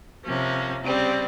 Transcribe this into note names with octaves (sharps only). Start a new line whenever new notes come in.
C3 F3 A#3 C#4
C#3 G3 C4